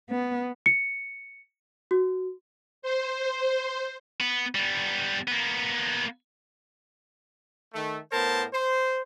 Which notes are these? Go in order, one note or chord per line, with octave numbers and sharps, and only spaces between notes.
B3
C#7
F#4
C5
B3
G3 B3
A#3 B3
D#3 A3
A2 B3 A#4 C5 A5
C5